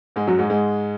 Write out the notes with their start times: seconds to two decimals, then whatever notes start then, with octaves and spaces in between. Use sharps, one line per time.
0.16 G#2 G#3
0.27 F#2 F#3
0.38 G#2 G#3
0.50 G#2 G#3